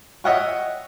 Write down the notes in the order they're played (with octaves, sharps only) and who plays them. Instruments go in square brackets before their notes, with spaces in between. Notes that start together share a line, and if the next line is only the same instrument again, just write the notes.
[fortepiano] C#5 D#5 E5 F#5 G5 C#6